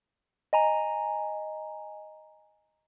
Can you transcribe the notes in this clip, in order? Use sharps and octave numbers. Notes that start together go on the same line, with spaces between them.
D#5 G#5 A#5